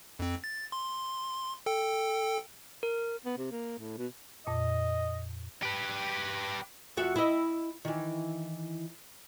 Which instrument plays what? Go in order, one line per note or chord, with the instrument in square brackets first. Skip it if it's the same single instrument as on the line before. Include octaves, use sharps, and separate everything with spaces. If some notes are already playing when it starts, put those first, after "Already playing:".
[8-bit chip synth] F2 C4
A6
C6
A4 G5
[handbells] A#4
[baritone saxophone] B3
C3
A#3
A2
B2
[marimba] F2 A#2 [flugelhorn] D#5
[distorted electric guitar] G4 B4
[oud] F2 F#4 E5
E4 D#5
D#3 E3